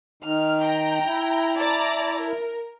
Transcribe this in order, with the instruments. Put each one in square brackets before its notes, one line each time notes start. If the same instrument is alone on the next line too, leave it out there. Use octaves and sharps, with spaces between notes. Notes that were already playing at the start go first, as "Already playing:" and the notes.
[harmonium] D#3 [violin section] F6
[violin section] G5 A#5
[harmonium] E4
[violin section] D5 A5 A#5
A#4